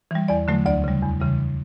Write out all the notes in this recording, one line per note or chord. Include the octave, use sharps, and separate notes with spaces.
E3 G3
E2 D5
D3 F#3 A3
D2 D5
C#3 G3
E2
C#3 E3 G3